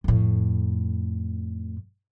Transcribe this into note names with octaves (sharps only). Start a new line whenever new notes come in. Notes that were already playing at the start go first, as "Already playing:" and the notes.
F2 A2